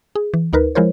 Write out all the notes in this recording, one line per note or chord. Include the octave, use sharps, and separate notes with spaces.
G#4
E3
D2 D#4 A#4 B4
F3 G#3 E4 A#4 C5 C#5